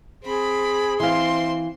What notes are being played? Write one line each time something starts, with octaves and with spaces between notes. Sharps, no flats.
C4 G#4 B5
E3 C4 F5 C6